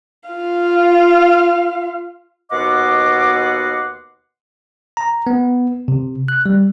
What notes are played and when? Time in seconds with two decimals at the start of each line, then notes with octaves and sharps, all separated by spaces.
0.30 F4 F5
2.51 D#2 B2 D#5 F#5 C6 D6
4.97 A#5
5.27 B3
5.88 C3
6.28 F#6
6.46 G3